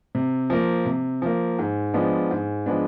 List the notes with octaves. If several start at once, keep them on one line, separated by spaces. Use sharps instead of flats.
C3
F3 A#3
C3
F3 A#3
G#2
F3 G#3 B3 D4
G#2
F3 G#3 B3 D4